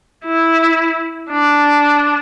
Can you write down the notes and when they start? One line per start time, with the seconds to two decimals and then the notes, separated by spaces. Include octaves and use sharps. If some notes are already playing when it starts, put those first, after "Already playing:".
0.25 E4
1.31 D4